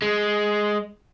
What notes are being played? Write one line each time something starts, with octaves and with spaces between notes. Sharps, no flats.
G#3